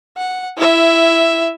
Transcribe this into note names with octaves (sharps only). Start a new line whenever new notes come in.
F#5
E4 E5